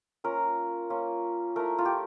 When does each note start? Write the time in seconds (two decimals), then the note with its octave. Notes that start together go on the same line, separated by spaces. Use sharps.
0.24 A#3 C#4 F4 A#4
0.90 A#3 C#4 F4
1.56 A3 E4 A#4
1.78 F4
1.85 G4